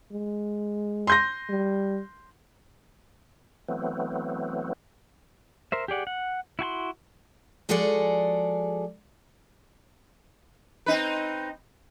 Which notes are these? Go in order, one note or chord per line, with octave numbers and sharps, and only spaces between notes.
G#3
C6 G6 A#6
G3
E3 F#3 A3 B3 C4
A#4 C5 E5
G4 G#4 D5 F#5
F#5
E4 F#4 G#5 C6
F3 G#3 F#4 G#4 A4 D5
C4 D#4 B4